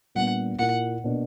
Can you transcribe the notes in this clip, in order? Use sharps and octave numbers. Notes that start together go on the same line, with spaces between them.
A#2 G3 B3 D4 F#5
A#2 A#3 E4 F#5
B2 A#3 D4